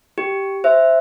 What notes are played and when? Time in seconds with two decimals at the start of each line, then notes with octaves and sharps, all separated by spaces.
0.18 G4
0.64 C5 E5